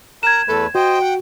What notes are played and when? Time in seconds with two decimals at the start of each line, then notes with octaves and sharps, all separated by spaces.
0.23 A#4 A#5 F#6 G#6 E7
0.48 E2 A3 A4 B4
0.75 F#4 C5 D#5 G5
1.02 F#5